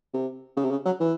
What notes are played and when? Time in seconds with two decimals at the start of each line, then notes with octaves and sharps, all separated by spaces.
0.13 C3
0.57 C#3
0.64 C3
0.71 C#3
0.85 F#3
1.00 E3